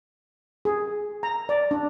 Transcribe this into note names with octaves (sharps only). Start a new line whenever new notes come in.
G#4
A#5
D5
D4